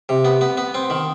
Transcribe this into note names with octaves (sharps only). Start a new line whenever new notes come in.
C3
B3
B3
B3
C4
D#3